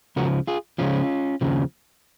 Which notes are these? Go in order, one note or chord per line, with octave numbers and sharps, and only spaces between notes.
C#2 C#3 F3 F#4 A#4
F4 G#4
C#2 C#3 F3 C#4 F4
D#2 C#3 F3